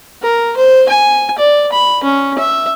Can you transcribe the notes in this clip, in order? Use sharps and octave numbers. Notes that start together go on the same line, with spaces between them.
A#4
C5
G#5
D5
B5
C#4
E5